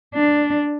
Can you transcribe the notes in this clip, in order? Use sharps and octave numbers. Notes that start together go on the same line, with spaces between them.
D4